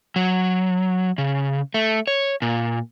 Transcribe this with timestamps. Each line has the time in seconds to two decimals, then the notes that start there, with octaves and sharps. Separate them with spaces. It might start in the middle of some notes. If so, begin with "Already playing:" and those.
0.16 F#3
1.18 C#3
1.74 A3
2.07 C#5
2.42 A#2